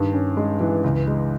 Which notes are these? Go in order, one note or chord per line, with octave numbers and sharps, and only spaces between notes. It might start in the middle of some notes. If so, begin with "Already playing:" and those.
Already playing: G2 D#3
C#4
G#3
E3
C#2
G#3